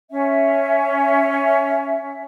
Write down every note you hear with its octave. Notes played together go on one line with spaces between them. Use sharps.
C#4 E5